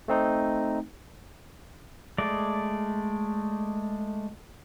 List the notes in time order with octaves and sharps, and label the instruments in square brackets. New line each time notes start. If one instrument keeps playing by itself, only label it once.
[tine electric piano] A3 C4 D#4
[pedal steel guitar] G#3 A3 D5